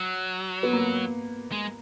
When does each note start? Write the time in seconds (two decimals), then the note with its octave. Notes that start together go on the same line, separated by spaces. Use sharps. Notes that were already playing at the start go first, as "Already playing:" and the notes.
Already playing: F#3
0.63 B3
0.73 A#3
1.52 G#3